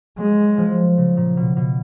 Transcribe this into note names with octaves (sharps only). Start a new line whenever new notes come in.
F#3 G#3
F3
C#3
A#2
B2
B2